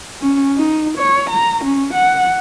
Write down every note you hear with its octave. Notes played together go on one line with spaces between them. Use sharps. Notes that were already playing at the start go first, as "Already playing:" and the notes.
C#4
D#4
C#5
A#5
C#4
F#5